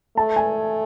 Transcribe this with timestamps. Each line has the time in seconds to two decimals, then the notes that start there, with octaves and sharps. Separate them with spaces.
0.17 A3 A5
0.36 G#5